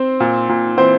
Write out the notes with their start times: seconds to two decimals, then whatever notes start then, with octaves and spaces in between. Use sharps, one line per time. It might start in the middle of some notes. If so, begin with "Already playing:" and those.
Already playing: C4 C5
0.20 A#2
0.49 A#2
0.77 E3 C4 C5